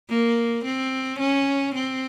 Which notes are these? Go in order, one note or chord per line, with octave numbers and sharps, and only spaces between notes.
A#3
C4
C#4
C4